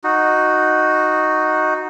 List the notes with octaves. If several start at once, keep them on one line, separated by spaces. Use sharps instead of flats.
D#4 F#4